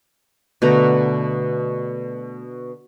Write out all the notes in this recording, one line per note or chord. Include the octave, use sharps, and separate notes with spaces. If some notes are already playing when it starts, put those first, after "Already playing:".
B2 D3 A3 A#5